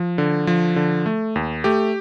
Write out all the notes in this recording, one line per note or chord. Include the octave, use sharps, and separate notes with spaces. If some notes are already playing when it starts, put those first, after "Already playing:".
Already playing: F3
D3
F3
D3
A3
D#2
A3 G4